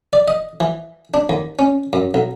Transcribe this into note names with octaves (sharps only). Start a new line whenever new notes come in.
D5
D#5
E3
D4
D#2
C#4
F#2
B1